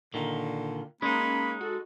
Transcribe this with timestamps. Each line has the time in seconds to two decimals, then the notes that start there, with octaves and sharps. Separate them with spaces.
0.14 A#2 D3 D#3
1.02 G#3 A#3 C#4 D#4 B5
1.61 F#4 A4